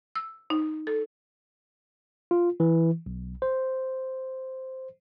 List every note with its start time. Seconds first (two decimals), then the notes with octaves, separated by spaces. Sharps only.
0.15 E6
0.50 D#4
0.87 A4
2.31 F4
2.60 E3
3.06 B1
3.42 C5